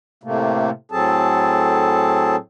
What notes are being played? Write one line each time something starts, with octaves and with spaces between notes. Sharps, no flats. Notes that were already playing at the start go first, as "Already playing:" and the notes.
A2 C3 A3 A#3
A2 F#3 C4 G#4 A4 A5